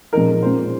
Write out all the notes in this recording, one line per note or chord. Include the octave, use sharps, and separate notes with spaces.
A#2 F3 G#3 D#4 A#4
A#2 G#3 C#4 F4 C5